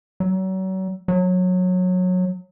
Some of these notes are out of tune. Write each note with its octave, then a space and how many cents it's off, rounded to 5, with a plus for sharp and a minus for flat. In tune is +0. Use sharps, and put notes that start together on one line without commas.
F#3 +35
F#3 -20